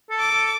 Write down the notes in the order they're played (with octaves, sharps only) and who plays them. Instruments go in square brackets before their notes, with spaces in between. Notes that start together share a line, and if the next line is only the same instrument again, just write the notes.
[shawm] A4
[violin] D6
[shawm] A4